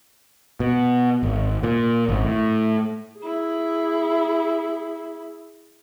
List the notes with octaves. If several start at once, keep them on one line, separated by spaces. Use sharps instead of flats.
B2
G#1
A#2
G#1
A2
E4 G#4